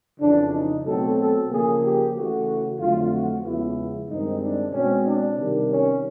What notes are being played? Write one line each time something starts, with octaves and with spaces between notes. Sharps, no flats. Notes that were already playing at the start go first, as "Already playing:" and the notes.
F2 C#3 E3 D4
D#4
B2 F#3 A3 C4 A4
A4
C#3 F3 A#3 G#4
G4
C#3 E3 A3 F#4
F2 D3 F#3 A3 C4 F4
F#4
E2 C#3 F3 G#3 B3 E4
G2 D#3 G#3 C4 D#4
D4
B2 G#3 C4 C#4
D4
C3 D#3 G3
C#4